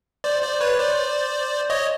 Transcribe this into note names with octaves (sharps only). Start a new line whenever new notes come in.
C5 D5
C5 D5
B4 C#5
C5 D5
C#5 D#5